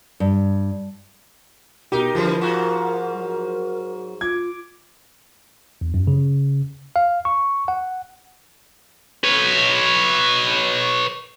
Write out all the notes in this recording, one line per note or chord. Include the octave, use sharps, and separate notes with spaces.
G2
B2 D#4 G4 A#4
D3 E3 F3 G3 G#3
G#2 F4 F#4
F#3
F4 D6 G#6
E2
F#2
C#3
F5
C#6
F#5
B4 C#5